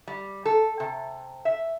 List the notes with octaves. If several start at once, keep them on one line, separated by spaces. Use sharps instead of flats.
G3
A4
C3
E5